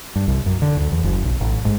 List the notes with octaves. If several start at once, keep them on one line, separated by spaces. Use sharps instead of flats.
G2
C2
F#2
D3
D2
E2
F#1
B1
A1
G#2